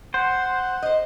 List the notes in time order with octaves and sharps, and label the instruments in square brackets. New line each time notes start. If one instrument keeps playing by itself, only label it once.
[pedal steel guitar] C5 [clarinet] F#5
[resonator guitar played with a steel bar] C5 D#5